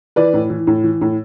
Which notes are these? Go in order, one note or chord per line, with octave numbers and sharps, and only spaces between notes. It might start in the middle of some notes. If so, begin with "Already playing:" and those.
E3 B4 D5
A2
E3
A2
E3
A2